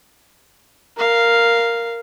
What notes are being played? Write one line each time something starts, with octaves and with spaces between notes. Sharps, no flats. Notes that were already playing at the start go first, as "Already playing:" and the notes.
A#4 F5